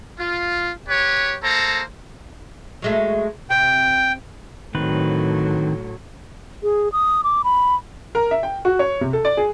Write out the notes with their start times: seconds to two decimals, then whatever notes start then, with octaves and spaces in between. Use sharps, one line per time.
0.19 F4
0.89 G4 B4 C#5
1.43 A#3 A4 C5 A#5
2.82 F#3 G#3 A3
3.50 C3 G5
4.75 A2 D3 D#3 F#3 C4 B4
6.63 G#4
6.92 D#6
7.24 D6
7.44 B5
8.15 A#4
8.31 E5
8.43 G5
8.65 F#4
8.79 C#5
9.01 C3
9.13 A4
9.25 D5
9.37 G#4